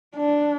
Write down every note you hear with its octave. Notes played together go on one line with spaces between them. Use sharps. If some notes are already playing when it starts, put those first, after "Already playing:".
D4